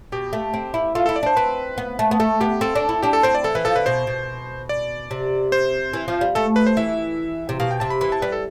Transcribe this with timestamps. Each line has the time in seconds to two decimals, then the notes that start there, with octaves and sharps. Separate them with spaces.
0.12 B2 G4
0.33 A3
0.54 C4
0.74 E4
0.95 F4 A4
1.06 E4 A4
1.16 D5
1.23 D4 C5
1.37 C4 B4
1.78 B3
1.99 A3
2.11 B3
2.20 A3 A4
2.41 B3 G4
2.61 C4 A4
2.75 D4
2.89 E4
3.02 D4 G4
3.13 A4
3.23 C4 C5
3.35 D5
3.44 E3 A4
3.55 E3 B4
3.65 F3 A4
3.75 D3 B4
3.86 B2 C5
4.07 B2
4.69 D5
5.11 C3
5.52 C5
5.93 E3
6.08 F3
6.21 G3
6.35 A3 A4
6.56 B4
6.67 C5
6.77 E3 E5
7.49 C3
7.60 B2 F5
7.71 G5
7.80 C3 A5
7.90 B5
8.01 E3 B5
8.12 A5
8.22 G3 B4
8.32 A4